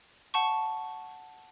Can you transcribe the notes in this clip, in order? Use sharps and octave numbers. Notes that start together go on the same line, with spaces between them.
F#5 A5 C#6